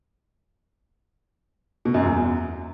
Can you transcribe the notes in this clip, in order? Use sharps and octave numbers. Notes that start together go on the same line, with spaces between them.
B2
F#2
E2